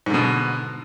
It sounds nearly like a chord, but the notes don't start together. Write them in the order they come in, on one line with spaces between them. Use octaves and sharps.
G#2 D3 B2